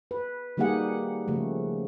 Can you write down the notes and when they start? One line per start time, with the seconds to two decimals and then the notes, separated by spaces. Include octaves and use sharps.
0.11 B4
0.57 D#3 G3 A#3 G4 G#4 F#5
1.28 C#3 F3 A3